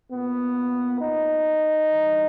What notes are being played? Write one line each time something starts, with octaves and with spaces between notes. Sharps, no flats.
A#2 B3
D#4
G2 E3